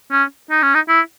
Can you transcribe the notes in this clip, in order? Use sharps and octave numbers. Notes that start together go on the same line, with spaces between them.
C#4
D#4
C#4
D#4
E4